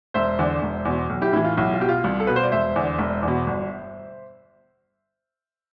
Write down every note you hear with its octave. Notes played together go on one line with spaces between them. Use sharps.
E1 C5 E5
E2 D3
E1
E2 B2
B1
E4 G4
A2 E3 E4
F4
B1 E4
F4
B2 G4
F4
C2
A4
B2 B4
C5
D5
E1 C5 E5
E2 D3
E1
E2
B2
G1